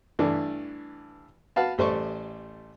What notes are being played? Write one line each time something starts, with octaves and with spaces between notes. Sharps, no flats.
G2 E3 A3 D4
F#4 B4 F5 A5
A1 G3 A3 C5 D5 C#6